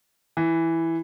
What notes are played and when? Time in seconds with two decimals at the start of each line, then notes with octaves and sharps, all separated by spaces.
0.37 E3